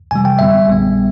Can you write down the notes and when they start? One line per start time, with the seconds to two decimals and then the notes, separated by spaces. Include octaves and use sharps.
0.11 F2 C3 E3 G3 G#5
0.25 G5
0.39 F#2 D3 G3 B3 E5
0.68 A#1 A#2 G3 B3